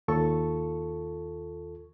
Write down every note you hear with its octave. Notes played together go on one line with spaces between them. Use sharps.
D#2 F4 A4 C#6